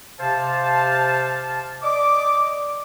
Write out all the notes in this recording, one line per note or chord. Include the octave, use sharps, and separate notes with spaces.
C3 C5 F5 A5
D5 D#5 D6